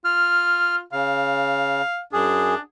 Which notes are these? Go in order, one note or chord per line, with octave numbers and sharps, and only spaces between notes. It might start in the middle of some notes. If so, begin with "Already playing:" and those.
F4 F6
C#3 F5
F#2 D4 G#4